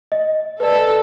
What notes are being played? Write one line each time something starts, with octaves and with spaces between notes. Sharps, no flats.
D#5
A4 B4 D5